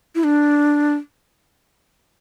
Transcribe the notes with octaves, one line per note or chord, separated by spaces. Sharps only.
E4
D4